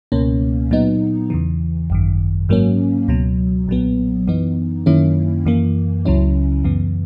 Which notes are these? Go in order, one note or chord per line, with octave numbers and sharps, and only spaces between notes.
C#2 B2 A#3 C#4
A#2 F#3 B3 D#4
E2 C#3 E3
G#1 F#2 D#3
G#2 F#3 A#3 C#4
C#2 B2 F#3
B1 A#2 F#3 B3
F#2 E3 B3 D#4
F#2 D#3 A#3 C#4 E4
F#2 E3 A#3
C#2 C#3 F#3 C#4 E4
F#2 C#3 E3 B3